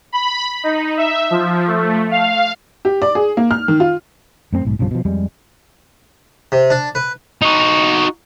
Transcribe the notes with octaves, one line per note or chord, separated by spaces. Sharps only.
B5
D#4
E5
F3
A3
F5
G4
D5
G#4
A#3
F6
D#3
F4
F#2 A3 C4
B1 G#2
B1 G2 C#3 F3
B2 F3
F2 G3 G#3
C3
D4
B4
D#4 F#4